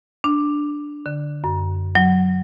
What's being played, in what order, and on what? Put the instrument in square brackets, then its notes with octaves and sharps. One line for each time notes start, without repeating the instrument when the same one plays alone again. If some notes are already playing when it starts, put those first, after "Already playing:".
[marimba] D4
D3
F#2
F#3